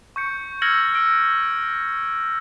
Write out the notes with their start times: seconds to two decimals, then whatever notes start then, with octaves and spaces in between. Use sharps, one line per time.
0.16 C#6 G6 C#7
0.62 E6 F6 G#6 A#6 C#7 F#7
0.94 E6 D7